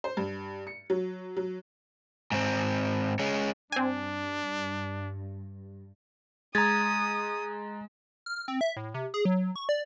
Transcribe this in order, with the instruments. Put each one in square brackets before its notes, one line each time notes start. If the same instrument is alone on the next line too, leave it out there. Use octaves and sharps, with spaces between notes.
[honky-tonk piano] C5
G2
C#7
F#3
F#3
[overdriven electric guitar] G#2 C4
G#3 C#4
[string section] G2 [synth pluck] C4 G#5 [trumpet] D4
[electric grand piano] G#3 [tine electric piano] A#5 A6 [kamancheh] D#6 [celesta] G#6
[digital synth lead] F6
C4
E5
A2
C3
G#4
F#3
C#6
D5